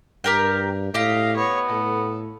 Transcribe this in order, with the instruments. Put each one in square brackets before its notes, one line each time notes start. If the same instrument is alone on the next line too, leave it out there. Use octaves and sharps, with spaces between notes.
[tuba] G2 [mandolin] G4 A#4 G5
[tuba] A2 [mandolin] G4 D#5 [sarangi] F5
[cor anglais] B3 [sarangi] C#5
[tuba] A2 [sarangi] A4